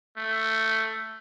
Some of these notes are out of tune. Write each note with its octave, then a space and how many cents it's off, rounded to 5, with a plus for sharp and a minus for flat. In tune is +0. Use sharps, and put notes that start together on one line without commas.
A3 +10